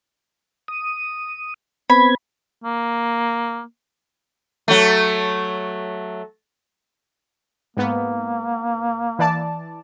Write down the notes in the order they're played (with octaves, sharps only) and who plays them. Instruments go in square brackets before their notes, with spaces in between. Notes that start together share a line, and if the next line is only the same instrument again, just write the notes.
[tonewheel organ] D#6
[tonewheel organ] B3 C4 G#6 [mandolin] B5
[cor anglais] A#3
[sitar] F#3 A3
[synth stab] G#2 B3 [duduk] A#3
[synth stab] E3 D5 A5